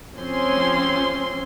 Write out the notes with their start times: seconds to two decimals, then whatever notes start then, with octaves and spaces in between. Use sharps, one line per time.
0.16 F3 C4 C#4 C6